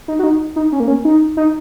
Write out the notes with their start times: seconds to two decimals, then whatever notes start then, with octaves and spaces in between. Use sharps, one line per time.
0.08 D#4
0.19 F#4
0.24 D#4
0.56 D#4
0.72 C#4
0.80 A#3
0.88 C#4
1.05 D#4
1.37 D#4